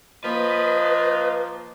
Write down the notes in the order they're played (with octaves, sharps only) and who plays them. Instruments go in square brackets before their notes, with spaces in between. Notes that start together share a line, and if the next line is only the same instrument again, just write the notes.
[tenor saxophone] F3 [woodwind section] A#3 [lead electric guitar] B4 [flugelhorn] D#5